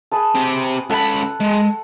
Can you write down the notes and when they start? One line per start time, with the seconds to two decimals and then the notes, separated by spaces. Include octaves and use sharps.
0.12 G#4 B4 A5
0.35 C4 G4
0.90 C#2 A4 F#5 B5
1.40 G#3